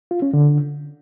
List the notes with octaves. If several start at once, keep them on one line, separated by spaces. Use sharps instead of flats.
F4
C#4
D3